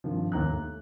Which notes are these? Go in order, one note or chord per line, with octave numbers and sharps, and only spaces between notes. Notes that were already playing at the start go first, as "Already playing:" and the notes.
G2 C3 D#3 F3
D#2 A#5 F#6
A3